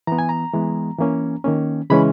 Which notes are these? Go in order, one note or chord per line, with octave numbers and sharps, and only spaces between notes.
E3 B3 A#5
G#5
A#5
E3 G#3 B3
E3 A#3 C#4
D#3 A#3 C#4
C#3 E3 G#3 C#4 B5